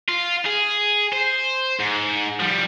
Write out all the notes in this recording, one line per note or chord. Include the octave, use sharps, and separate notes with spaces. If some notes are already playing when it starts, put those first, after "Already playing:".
F4
G#4
C5
G#2
F3 G3